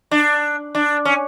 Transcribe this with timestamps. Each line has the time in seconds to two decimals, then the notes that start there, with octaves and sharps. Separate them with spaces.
0.11 D4
0.75 D4
1.05 C#4